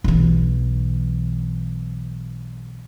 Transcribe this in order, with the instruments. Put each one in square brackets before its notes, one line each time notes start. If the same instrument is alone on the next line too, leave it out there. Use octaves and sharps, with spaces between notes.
[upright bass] B1 E3